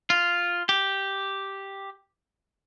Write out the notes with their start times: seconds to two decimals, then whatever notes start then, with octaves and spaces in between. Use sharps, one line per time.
0.10 F4
0.69 G4